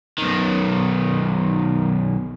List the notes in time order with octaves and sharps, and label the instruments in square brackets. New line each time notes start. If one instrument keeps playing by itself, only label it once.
[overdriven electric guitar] B1 D#3